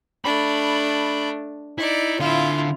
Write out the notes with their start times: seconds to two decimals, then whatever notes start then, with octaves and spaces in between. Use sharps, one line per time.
0.24 A3 D4 B5
1.78 D#4 E4 D5
2.20 D3 E4 F4 F5